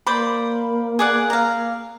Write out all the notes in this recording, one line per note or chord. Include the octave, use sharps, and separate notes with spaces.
A#3 C5 D5 B5
G#4 D5 F#5
F5 A#5